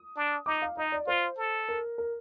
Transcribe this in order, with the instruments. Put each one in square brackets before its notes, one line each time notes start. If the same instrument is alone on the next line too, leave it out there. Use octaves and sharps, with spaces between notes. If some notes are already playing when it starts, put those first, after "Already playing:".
Already playing: [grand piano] D#6
[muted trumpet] D4
[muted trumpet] D#4 [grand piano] D6
[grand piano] F5
[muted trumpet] D#4 [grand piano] D#5
[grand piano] D5
[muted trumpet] F4 [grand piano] C5
[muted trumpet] A4
[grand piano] A#4
A#4